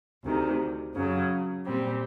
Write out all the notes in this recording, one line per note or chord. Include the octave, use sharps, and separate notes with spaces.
D2 C3 D#3
F#2 C#3 F#3
A#2 G3 C4